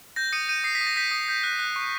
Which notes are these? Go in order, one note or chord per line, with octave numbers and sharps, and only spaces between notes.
G6 A#6
D#6 C#7 D#7
G6 C#7 D#7
D#6 C7
B6
D#6
A#6
G6 B6
D#6
G6
F#6
F#6
C#6